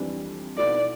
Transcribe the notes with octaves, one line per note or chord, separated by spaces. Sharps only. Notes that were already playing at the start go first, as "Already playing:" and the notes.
Already playing: F2 E3 G3 D4 G4
B1 B2 B3 E4 A4 D5